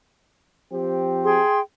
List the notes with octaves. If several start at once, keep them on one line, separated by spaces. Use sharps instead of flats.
F3 C4 G4
G#4 G5 C6